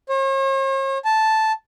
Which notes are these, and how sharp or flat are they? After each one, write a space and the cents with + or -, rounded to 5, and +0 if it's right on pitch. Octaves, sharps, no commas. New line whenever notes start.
C#5 -45
A5 -5